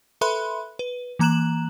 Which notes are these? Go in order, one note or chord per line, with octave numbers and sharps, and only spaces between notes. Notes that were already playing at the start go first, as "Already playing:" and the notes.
A4 B4 E5 B5 C6 F#6
B4
E3 A#3 A#5 F#6 E7 F#7